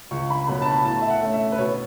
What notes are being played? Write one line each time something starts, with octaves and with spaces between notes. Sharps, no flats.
C#2 C#6
B5
B2 F#3 B3 B5
A5
B5
A2 A5
E5
F#5
A3 C#4
E5
B4
B2 C#5